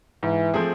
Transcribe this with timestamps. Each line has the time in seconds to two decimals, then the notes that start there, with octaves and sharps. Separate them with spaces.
0.23 G#2 E3
0.54 F3 A3 C4 G#4